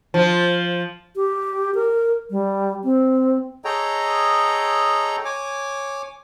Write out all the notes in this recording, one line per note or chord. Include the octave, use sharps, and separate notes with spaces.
F3 F4
G4
A#4
G3
C4
G#4 A4 C#5 D#5 G5 A#5
C#5 G#5 D6